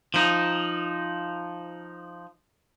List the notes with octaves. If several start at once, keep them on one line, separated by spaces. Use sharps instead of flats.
F3 D#4